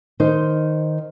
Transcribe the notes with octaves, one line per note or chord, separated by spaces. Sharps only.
D#3 D#4 C5